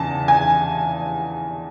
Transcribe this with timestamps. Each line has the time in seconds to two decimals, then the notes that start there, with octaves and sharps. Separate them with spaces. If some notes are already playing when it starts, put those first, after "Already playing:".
Already playing: E2 C#3 E3 A5
0.28 G#5